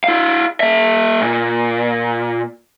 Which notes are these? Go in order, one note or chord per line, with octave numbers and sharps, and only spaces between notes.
E4 F5
A#3 E5
A#2